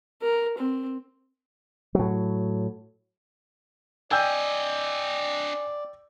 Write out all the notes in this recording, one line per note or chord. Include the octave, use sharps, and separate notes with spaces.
A#4
C4
A2 F#3
D4 D5 D#5 G5 G#5 E6 G6